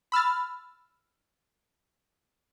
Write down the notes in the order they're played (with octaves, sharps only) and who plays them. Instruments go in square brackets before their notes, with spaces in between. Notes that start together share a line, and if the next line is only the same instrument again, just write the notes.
[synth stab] B5 E6 F6 A6